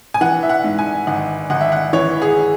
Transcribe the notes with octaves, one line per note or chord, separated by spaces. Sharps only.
G#5
E3 F#5
E5
F#5
G#2
G#5
G#1 F#5
G#1 F#5
E5
F#5
E3 C#5
G#4